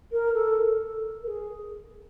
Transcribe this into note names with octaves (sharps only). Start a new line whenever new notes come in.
A#4
A4
A#4
G#4